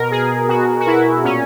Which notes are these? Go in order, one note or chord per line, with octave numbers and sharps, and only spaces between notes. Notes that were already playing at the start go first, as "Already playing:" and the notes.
Already playing: B2 A#4
G#4
B2 F#4
F#4
E4
A#2 C#4